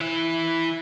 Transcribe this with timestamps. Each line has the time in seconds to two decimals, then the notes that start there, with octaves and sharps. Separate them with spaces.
0.01 E3 E4